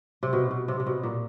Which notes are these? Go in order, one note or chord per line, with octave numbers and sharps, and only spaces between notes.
C3
B2
B2
C3
C3
B2
A#2